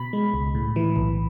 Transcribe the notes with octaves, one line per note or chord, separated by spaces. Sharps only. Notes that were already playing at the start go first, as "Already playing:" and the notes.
Already playing: B2 B5
G#3
C#2
A2
E3
B1